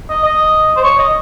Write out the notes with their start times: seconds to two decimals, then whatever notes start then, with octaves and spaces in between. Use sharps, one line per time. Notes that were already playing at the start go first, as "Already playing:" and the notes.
0.09 D#5
0.24 D#5
0.77 C5
0.84 C#5
0.99 D#5